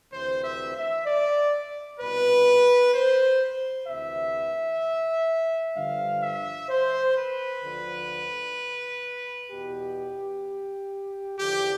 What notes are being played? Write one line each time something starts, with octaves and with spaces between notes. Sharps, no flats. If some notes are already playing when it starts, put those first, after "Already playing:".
D2 C3 E3 C5
E5
E5
D5
C2 B2 B4
C5
D2 C3 E3 E5
G2 D3 F3 F5
E5
C5
B4
D2 D3 F3
E2 B2 G4
E2 D3 F3 G4